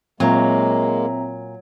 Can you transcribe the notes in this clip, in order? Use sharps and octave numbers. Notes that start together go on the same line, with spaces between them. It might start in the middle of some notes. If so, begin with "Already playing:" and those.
A#2 F#3 G#3 A#3 C4 A#4 E5 A#5